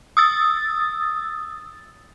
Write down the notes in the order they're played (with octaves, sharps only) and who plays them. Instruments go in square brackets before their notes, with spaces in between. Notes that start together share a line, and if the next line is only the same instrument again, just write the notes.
[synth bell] D#6 E6 A6